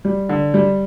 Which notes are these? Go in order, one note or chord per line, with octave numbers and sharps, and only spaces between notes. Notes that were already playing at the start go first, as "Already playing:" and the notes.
G3
D3
G3